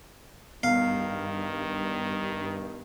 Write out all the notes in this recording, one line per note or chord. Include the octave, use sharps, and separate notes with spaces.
G2 D#3 B3 F5